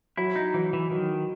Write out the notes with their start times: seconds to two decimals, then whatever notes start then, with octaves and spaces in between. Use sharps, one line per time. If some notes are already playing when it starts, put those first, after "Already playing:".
0.17 F#3 E4
0.36 D#4
0.54 E3 F#3
0.73 E3
0.91 D#3 F#3